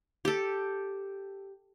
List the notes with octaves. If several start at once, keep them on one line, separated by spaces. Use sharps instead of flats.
G4 A4